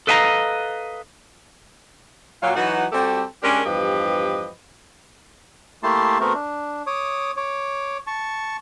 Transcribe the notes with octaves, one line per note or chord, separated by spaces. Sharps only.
A4 B4 D#5 F5 G#5 A#5
A#2 F#3 F5
E3 F#3 D#4 F#4 B4 F#5
G3 C4 F#4 G4 A4
G#3 C#4 D4 G4 A#4
E2 G2 F3 G4 B4 D#5
A3 A#3 E4 G4 A5 C6
A3 B3 C4 F#4 A#4
D4
C#5 D6 D#6
C#5 D6
A5 C#6